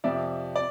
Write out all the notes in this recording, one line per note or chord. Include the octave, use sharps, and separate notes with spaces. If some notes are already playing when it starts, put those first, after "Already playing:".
F2 C3 F3 D5 E5
D5